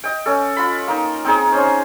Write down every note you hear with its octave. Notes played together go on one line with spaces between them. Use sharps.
D#5 G5
C#4 A4
F4 B5
A#3 D#4
C4 D#4 G#4
C#4 C5